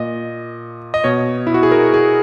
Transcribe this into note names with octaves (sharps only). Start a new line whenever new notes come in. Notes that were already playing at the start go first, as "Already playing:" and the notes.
Already playing: A#2 D#5
D#5
B2 C#5
E4
F#4
G#4
A#4
G#4